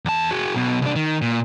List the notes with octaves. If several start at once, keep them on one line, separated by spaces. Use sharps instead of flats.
E2 A5
F#4 G#4
B1 B2
C2 D4
D#3
A#2